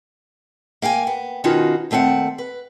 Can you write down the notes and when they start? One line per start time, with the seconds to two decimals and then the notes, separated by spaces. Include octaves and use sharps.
0.82 A#3 F5 G5 G#5
1.07 B3
1.44 B2 D#3 C#4 D#4 F4 F#4
1.91 D#2 A3 C4 E5 F#5
2.38 B4